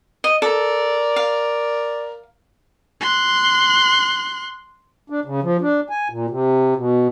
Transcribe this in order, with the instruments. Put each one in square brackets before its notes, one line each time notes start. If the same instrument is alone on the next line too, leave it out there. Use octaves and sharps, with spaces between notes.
[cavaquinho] D#5
[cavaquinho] A4 [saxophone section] A#4 D5
[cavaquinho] F5
[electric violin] C6 F#6
[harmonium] D4
C#3
F3
D4
G#5
A#2
C3
B2